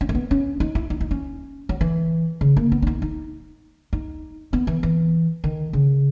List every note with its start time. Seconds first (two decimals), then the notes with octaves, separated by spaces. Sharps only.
0.01 C#4
0.09 A#3
0.15 B3
0.31 C#4
0.60 D#4
0.75 E4
0.90 D#4
1.01 D#4
1.11 C#4
1.69 F#3
1.81 E3
2.41 C#3
2.57 A#3
2.72 B3
2.82 C#4
2.87 D#4
3.02 D#4
3.93 D#4
4.53 B3
4.67 E3
4.83 E3
5.44 D#3
5.73 C#3